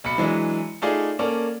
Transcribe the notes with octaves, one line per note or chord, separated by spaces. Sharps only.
B1 B5 C#7
E3 F#3 G#3 D4 E4
A3 D#4 F4 G#4 D5
A#3 C#4 A4 D5